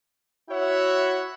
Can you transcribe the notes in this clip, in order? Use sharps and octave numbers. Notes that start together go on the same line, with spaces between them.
E4 F#4 C#5 E5 F#5